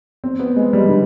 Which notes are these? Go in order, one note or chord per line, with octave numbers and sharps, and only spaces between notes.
C4
B3
G#3
G3
D3